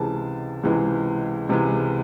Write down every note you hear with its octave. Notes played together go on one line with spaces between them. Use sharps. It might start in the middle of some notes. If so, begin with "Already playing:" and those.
Already playing: C#2 C3 E3 G#3 A5
C#2 C3 E3 G#3
C#2 C3 E3 G#3